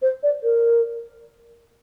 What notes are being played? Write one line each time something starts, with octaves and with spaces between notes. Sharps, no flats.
C5
D5
A#4